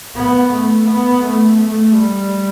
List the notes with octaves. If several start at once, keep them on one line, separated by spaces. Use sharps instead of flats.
B3
A3
B3
A3
A3
G3